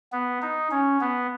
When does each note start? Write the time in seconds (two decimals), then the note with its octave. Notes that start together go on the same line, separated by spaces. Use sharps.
0.12 B3
0.42 D#4
0.71 C#4
1.01 B3